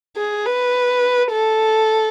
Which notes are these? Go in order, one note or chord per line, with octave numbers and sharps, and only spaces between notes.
G#4
B4
A4